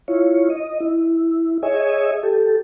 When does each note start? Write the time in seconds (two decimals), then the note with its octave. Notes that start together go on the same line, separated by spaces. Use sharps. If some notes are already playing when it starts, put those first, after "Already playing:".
0.08 E4 F4 C#5
0.50 D#5
0.80 E4
1.63 G#4 C#5 D#5 E5 G#5
2.23 G4 A4